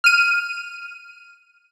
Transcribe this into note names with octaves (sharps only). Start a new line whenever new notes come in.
F6 D#7